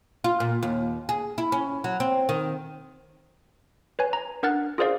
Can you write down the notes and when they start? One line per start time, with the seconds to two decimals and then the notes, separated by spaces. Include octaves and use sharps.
0.24 F4
0.40 A#2
0.63 D#2
1.09 G#4
1.38 E4
1.52 C#4
1.84 F#3
2.00 C4
2.29 D#3
3.99 B4 C#5 G#5
4.13 A#5
4.43 D4 A#4 F#5 F6 F#6 A6
4.78 F4 G#4 A#4 C5 D5 F5